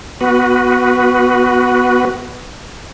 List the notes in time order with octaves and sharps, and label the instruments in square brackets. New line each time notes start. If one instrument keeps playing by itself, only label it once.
[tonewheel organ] B3 F#4 B4